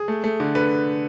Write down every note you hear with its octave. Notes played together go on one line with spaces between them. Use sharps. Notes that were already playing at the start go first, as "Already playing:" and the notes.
Already playing: G#4
A3
A3
D3
D3 B4